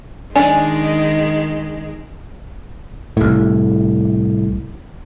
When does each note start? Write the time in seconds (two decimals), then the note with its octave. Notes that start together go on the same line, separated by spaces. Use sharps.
0.36 D#3 G#3 D4 G#5
3.17 C2 A2